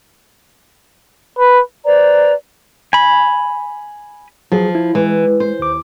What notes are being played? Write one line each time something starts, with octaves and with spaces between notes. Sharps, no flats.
B4
B4 C5 D5 A#5
G#5 B5
F3 F#3 G#4
E4
E3 G#3
C5
D#2 D6